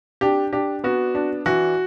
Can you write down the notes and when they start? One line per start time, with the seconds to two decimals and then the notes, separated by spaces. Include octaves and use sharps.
0.21 D4 G4
0.53 D4 G4
0.84 B3 F#4
1.15 D4
1.46 E3 F#4